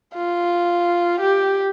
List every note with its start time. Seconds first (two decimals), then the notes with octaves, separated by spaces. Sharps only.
0.15 F4
1.21 G4